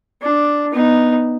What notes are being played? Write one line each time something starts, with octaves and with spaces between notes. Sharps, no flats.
D4
B3 D#4